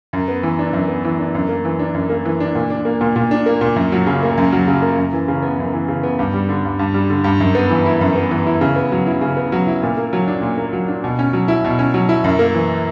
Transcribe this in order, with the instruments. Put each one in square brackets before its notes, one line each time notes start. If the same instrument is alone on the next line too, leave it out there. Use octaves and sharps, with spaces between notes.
[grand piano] F#2
B3
E3
D4
F#2
B3
E3
D4
F#2
A#3
E3
D4
F#2
A#3
E3
D4
A#2
D4
A#3
A#2
A#2
D4
A#3
A#2
F#2
F#3
C#3
A#3
F#2
F#3
C#3
A#3
F#2
E3
C#3
B3
F#2
E3
C#3
B3
G2
G3
D3
G2
G2
G3
D3
G2
F#2
B3
E3
E4
F#2
B3
E3
E4
C#3
B3
F#3
E4
C#3
B3
F#3
E4
A#2
A#3
F#3
D4
A#2
A#3
F#3
D4
B2
C#4
F#3
E4
B2
C#4
F#3
E4
F#2
A#3
E3